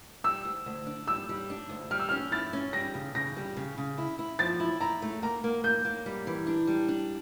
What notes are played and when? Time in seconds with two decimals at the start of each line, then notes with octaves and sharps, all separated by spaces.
0.24 G3 E6
0.45 D2
0.66 D2
0.87 D4
1.08 G3 E6
1.29 G3
1.50 D4
1.69 D2
1.91 G3 F6
1.99 E6
2.09 C#4 F6
2.32 E4 A6
2.53 C#4
2.73 G3 A#6
2.94 C#3
3.15 C#3 A#6
3.37 G3
3.57 C#3
3.78 C#3
3.98 E4
4.19 E4
4.39 F3 A6
4.60 E4
4.81 E4 A#5
5.02 A3
5.23 A#3 A#5
5.44 A#3
5.64 A#3 G6
5.85 A#3
6.06 G3
6.27 E3
6.47 D4
6.67 G3
6.88 D4